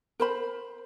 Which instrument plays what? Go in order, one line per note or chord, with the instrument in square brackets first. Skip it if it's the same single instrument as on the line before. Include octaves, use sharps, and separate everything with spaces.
[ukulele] A#4 C5 B5